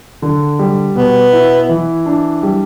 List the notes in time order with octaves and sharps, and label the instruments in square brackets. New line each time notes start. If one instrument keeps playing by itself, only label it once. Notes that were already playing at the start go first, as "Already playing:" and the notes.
[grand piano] D3
G3
[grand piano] B2 [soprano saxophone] B3
[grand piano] E4
E3
D4
G3